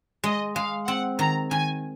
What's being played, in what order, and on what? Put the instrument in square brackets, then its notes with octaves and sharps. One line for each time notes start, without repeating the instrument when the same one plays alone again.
[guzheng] G#3 [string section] D#5
[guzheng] G#3 [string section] F5
[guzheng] C4 [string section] F#5
[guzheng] D#3 [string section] A#5
[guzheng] D#3 [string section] G#5